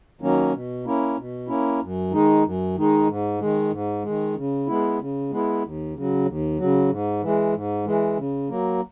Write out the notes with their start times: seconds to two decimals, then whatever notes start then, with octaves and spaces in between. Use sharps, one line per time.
0.21 D#3 F#3 A#3 C#4
0.53 B2
0.85 A#3 C#4 E4
1.17 B2
1.48 A#3 C#4 E4
1.81 F#2
2.11 D#3 G#3 D#4
2.44 F#2
2.76 D#3 G#3 D#4
3.07 G#2
3.39 D#3 G#3
3.71 G#2
4.03 D#3 G#3
4.36 C#3
4.66 G#3 B3 E4
4.99 C#3
5.31 G#3 B3 E4
5.62 D#2
5.94 C#3 F#3
6.26 D#2
6.58 C#3 F#3
6.90 G#2
7.22 E3 G#3
7.53 G#2
7.86 E3 G#3
8.17 C#3
8.49 F#3 A#3